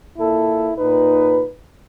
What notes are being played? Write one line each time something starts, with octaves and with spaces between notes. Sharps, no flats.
A#2 A#3 E4 A4
A#2 D#4 B4